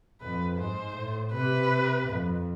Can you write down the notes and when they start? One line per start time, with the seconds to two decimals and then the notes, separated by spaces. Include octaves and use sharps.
0.21 F2 B4
0.58 G#2 C5
0.96 A2
1.33 C3 B4
2.08 F2